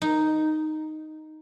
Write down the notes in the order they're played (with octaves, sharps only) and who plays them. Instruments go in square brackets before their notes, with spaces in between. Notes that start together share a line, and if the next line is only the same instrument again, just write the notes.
[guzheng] D#4